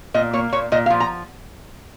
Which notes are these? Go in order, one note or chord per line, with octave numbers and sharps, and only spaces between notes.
A#2 D#5
A#3 C#5
A#2 C#5
A#2 D#5
F5
F3
A#5